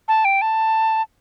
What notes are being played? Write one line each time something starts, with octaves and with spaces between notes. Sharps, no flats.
A5
G5
A5